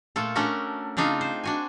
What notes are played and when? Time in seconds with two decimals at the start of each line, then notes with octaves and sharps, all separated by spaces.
0.16 A#2 A3 F4 A4
0.35 A3 C#4 D4 F#4 A#4
0.97 C#3 C4 D4 D#4 F4
1.21 C5
1.44 D4 F#4 G#5